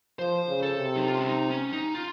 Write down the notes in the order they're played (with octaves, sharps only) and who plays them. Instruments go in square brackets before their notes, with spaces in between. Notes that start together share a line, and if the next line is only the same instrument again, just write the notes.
[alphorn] F3 [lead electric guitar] C5
[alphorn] C#3
[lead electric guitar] A4
[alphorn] C3
[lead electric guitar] D#4
F4
C#4
D#4
C#4
D#4
F4